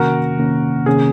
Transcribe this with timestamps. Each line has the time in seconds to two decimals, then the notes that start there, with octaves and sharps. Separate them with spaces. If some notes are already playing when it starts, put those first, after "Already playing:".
Already playing: C3 D#3 A#3 C#4 F#4 A#4
0.38 C3 D#3 A#3 C#4
0.86 C3 D#3 A#3 C#4 G#4